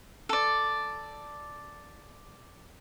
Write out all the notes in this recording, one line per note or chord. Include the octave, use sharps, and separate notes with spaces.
A4 D5